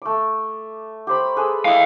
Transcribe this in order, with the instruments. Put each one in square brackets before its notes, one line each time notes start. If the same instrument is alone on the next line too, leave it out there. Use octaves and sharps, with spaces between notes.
[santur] A3 D6
G4 C5 B5
G#4 A4 B4
[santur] E4 [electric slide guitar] D#5 F5